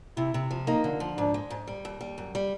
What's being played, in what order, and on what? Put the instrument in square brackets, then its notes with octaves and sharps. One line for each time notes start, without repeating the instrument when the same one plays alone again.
[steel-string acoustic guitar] C3 [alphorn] E4
[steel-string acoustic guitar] C3
F3
[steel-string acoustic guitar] A#3 [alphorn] D#4
[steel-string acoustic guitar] D3
F3
[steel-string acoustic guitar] G#2 [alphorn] D4
[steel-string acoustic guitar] G#3
G#2
G3
D#2
G3
F#2
G3